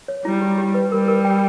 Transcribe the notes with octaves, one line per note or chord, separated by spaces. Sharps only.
C#5
G3 E4
G4
G4
B4
G3 A#4
A#4
G5